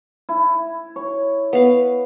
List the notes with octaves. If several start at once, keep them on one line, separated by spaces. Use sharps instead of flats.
E4
C#5
B3 F5